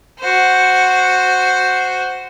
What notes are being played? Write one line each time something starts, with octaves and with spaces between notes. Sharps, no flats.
F#4 C5